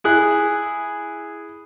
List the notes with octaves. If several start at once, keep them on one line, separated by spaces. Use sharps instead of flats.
E4 G#4 F#6